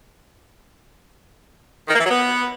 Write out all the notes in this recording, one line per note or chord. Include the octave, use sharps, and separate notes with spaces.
D#3
A#3
E3
F#3
B3